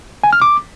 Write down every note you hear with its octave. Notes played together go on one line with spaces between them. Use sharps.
G#5
F6
D6